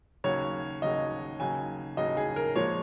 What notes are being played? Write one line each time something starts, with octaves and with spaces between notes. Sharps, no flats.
D#2 C#3 F#3 C#5
D#2 C#3 F#3 D#5
D#2 C#3 F#3 G#5
D#2 C#3 F#3 D#5
G#4
A#4
A#2 F3 G#3 C#5